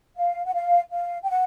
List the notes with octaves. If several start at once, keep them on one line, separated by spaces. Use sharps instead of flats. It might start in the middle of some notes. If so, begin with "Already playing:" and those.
F5
F#5
F5
F5
G5
F#5